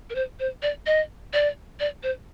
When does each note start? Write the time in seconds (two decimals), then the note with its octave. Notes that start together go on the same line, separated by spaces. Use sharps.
0.10 A#4
0.15 C5
0.40 C5
0.62 D5
0.86 D#5
1.33 D5
1.80 D5
2.03 C5